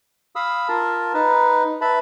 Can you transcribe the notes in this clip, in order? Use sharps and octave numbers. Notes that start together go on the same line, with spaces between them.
F5 B5 D#6 E6
F4 A#4 A5
D#4 B4
B4 E5 A5 B5